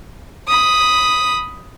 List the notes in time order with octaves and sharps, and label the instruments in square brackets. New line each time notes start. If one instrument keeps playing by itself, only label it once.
[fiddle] B5 D#6